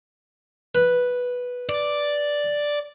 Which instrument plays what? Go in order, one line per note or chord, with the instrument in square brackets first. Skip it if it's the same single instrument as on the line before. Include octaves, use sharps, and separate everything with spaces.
[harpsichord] B4
[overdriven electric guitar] D5